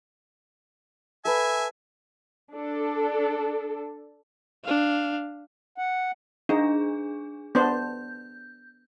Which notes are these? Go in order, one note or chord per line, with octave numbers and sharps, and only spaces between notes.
A4 B4 E5 G#5
D4 A4
D4 F5
F#5
D4 D#4 G#4
B3 D4 C5 G6